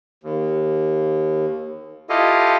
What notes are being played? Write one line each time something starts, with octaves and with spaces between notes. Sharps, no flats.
D#2
E4 F4 G4 A4 D#5 F5